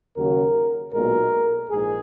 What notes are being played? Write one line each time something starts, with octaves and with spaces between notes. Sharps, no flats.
D#2 C#3 F#3 A#4
B1 A#2 G#3 A#4
A#1 G#2 G#4